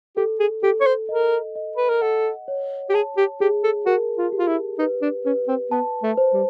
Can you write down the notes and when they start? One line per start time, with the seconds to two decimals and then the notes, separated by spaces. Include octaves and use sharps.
0.17 G4 A4
0.40 G#4
0.63 G4 A4
0.81 C#5
0.86 C5
1.09 A#4 D#5
1.55 D#5
1.76 B4
1.89 A#4
2.01 A4 F#5
2.48 C#5
2.90 G4
2.94 G#4 A5
3.17 G4
3.40 G4 G#4
3.64 A4
3.86 F#4 A#4
4.18 F4
4.32 G4
4.39 F4
4.48 E4
4.79 D#4 B4
5.02 D4
5.25 C#4 B4
5.48 C4
5.71 B3 A5
6.03 A3
6.17 C5
6.33 G3